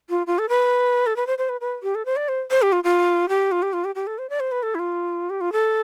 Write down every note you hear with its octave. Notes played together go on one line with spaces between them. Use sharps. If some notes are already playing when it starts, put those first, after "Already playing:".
F4
F4
A4
B4
A4
B4
C5
C5
B4
B4
G4
A4
C5
D5
C5
C5
G4
F4
F4
G4
F4
G4
F4
G4
G4
A4
C5
D5
C5
B4
A4
E4
F4
G4
F4
A4